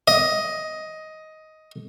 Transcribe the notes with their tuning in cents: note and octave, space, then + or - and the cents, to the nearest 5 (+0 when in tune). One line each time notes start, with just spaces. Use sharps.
D#5 +10